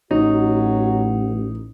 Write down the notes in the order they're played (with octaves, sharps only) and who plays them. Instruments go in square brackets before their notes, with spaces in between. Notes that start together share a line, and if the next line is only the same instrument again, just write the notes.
[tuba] A1 [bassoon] F#3 [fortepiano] D#4 [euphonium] F#4